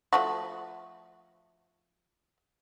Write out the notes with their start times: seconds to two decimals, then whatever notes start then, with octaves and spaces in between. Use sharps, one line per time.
0.13 F3 A3 F#4